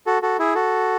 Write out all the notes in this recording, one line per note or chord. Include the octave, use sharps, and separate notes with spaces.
F#4 A4
F#4 A4
E4 G#4
F#4 A4